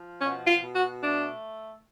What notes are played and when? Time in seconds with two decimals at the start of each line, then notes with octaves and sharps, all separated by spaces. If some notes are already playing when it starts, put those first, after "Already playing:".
Already playing: F3
0.20 B2 C#4
0.47 F4
0.61 B2
0.75 F#4
1.01 A3 D4